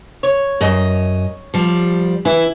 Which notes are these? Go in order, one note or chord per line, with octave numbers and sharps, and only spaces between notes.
C#5
F#2 D#5
F3 G3
E3 E4